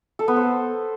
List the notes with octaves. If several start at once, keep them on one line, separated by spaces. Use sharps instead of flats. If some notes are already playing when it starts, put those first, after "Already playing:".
A4
B3
C5